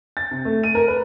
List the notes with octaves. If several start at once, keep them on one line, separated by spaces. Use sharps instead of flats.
A6
C3
A3
D#7
A#4
B4